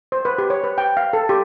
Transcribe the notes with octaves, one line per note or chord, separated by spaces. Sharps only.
C5
B4
G4
C#5
B4
G5
F5
A4
G4